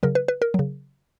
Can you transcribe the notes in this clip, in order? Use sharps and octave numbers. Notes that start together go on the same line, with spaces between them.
C#3 F#3 A#4
B4
B4
A#4
C#3 F#3